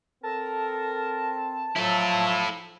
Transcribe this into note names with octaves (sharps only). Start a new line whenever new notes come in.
C4 A4 A#4 A5
F3 F#3 E4 A4